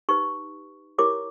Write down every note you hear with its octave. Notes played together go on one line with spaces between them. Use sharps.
D#4 G4 B4 C#6
E4 G4 A#4 C#5 D6